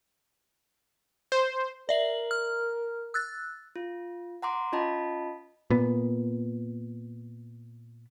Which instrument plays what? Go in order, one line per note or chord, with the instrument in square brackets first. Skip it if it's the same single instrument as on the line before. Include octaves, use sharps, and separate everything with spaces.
[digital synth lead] C5
[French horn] A#4 [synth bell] D5 E5 F#7
[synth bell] F6
E6 F#6 A6
[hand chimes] F4
F#5 A#5 C6 D6
C#4 F4 D#5 A5 B5
[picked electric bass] A#2 B3